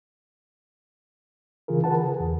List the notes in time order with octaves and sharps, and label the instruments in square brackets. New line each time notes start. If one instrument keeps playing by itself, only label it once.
[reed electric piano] C#3 E3 F4 G#4 A#4
A#4 B4 F#5 A5
G#4
E2